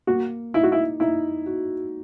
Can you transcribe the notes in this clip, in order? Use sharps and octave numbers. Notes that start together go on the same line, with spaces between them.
A#3 F#4
D#4 E4
F#4
E4
D#4 E4
F#4